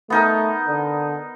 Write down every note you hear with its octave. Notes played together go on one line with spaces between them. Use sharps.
A3 B3 D#4 A#4
D3